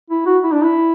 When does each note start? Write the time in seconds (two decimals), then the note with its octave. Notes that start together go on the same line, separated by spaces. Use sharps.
0.10 E4
0.26 F#4
0.43 E4
0.52 D4
0.62 E4